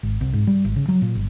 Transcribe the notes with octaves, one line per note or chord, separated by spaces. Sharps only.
G#1
C2
G#2
G3
G#1
C#3
F#3
A#2
G1